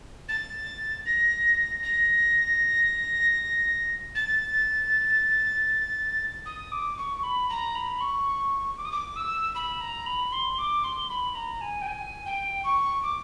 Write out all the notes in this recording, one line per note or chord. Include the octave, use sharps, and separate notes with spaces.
A6
A#6
A#6
A6
D#6
D6
C#6
B5
A#5
B5
C#6
D6
D#6
D6
E6
B5
A#5
B5
C6
D6
C6
B5
A#5
G#5
G5
G#5
G5
C#6
D6